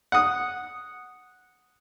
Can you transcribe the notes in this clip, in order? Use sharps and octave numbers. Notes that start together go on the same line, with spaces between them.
F#5 D#6